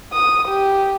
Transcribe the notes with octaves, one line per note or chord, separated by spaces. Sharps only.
D#6
G4